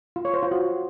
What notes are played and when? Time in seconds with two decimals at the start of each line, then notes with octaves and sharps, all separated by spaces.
0.16 F4
0.25 C#5
0.34 C5
0.43 F4
0.51 F#4